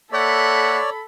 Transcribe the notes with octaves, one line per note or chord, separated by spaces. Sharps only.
A#3 A4 C#5 D5 E5 F#5 B5